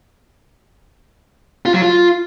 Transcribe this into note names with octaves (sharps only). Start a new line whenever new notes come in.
F4
F#3
F4